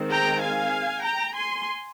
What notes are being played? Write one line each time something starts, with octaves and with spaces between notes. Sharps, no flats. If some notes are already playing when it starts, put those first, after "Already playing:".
Already playing: D#3 G#3 C4
G5 A#5
F5 G#5
G5 A#5
G#5 C6